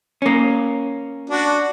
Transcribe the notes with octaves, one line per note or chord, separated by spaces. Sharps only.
A#3 C#4
D4 F#4